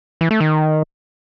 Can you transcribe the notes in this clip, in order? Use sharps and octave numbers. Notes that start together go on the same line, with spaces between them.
E3
A3
D#3